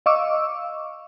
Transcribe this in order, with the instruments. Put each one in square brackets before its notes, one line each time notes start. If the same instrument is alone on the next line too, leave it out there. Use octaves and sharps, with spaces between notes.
[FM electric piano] D#5 F5 C#6 D6 E6